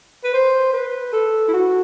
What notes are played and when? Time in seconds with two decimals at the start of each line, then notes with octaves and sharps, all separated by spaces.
0.24 B4
0.34 C5
0.73 B4
1.13 A4
1.48 E4
1.53 F#4